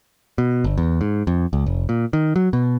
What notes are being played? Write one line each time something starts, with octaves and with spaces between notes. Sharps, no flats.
B2
G1
E2
G#2
F2
C#2
F1
A#2
D#3
F#3
B2